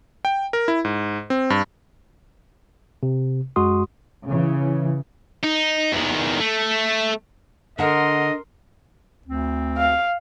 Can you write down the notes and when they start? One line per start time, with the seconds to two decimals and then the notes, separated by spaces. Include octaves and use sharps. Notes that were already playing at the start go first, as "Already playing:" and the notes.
0.25 G5
0.53 A#4
0.68 E4
0.85 G#2
1.30 C4
1.50 G2
3.03 C3
3.56 F#2 G#3 F#4 C6 D#6
4.25 C#3 E3
5.43 D#4
5.92 E2 D#3
6.41 A3
7.79 D3 D4 A#4 D#5 F#5 C6
9.27 D2 C4
9.78 F5